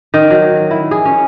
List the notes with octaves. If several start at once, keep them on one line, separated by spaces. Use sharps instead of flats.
D#3
F#3
E4
G#4
C#4